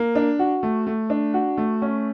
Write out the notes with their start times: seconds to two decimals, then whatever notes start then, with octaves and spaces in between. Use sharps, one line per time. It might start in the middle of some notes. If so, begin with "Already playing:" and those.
Already playing: A#3
0.15 D4
0.39 F#4
0.63 A3
0.87 A3
1.10 D4
1.34 F#4
1.57 A3
1.82 C#4